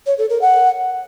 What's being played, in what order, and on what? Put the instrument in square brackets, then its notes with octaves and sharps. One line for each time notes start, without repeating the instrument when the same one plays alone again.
[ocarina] C#5
A4
A#4
F#5